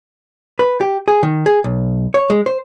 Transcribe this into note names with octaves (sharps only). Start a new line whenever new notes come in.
B4
G4
G#4
D#3
G#4
B1
C#5
G#3
C5